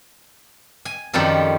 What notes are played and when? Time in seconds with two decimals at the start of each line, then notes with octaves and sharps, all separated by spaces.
0.85 G#5
1.13 F#2 D#3 F3 G3 F4 A4